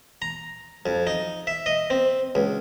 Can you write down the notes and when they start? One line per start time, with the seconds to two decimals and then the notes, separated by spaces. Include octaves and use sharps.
0.22 A#5
0.86 F2
1.07 D#4
1.47 E5
1.66 D#5
1.90 C4
2.35 C#2